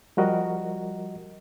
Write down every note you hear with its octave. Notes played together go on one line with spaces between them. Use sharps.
F3 G3 F#4 A#4 D#5